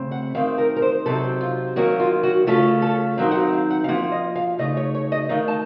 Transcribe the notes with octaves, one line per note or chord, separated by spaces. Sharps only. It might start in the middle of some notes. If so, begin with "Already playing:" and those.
Already playing: C#3 A3 C4
F#5
D#3 A3 C4 D#4 F5
A#4
A#4
C5
C3 F#3 C4 D#4 A4
F4
D#3 F#3 A#3 C#4 F#4
F4
F#4
C#3 A3 C#4 F4 A4
A4
D#3 F#3 C4 D#4 F5
F#5
F5
F5
F#5
F5
F3 A#3 F4 F#5
D#5
F5
C#3 A3 D#4 D#5
C#5
C#5
D#5
D#3 A3 D#4 F5
A5